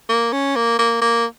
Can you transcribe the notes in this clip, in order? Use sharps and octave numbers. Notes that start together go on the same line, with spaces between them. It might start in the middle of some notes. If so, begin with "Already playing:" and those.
A#3
C#4
A#3
A#3
A#3